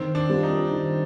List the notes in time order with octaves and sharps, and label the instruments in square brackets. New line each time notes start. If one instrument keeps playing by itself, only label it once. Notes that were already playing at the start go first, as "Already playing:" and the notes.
Already playing: [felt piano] D#3 [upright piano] C4
[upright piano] D4
[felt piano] G3 C4 F4
[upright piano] D#4
[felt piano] D#3